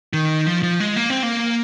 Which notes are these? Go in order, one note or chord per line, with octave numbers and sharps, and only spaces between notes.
D#3
F3
F3
G#3
A#3
C4
A#3